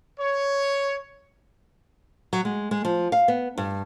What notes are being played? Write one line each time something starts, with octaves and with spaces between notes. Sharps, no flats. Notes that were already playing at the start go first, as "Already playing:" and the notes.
C#5
F#3
G#3
G#3
F3
F5
B3
G2